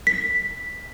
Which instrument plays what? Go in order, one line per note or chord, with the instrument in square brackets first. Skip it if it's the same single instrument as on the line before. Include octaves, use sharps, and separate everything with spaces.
[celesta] B6